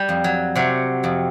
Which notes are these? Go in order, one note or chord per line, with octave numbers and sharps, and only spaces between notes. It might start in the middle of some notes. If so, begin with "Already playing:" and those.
Already playing: G3
F2
F#3
C3 F#3
F2